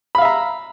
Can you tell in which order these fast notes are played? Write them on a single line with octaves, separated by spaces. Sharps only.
B5 F5 E5 A#5